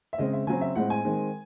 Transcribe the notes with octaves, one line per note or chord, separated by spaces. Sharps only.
E5
C#3 G#3 C4 D#5
E5
C#3 F#3 C4 G#5
E5
A2 G#3 C4 F#5
G#5
D#3 G#3 C4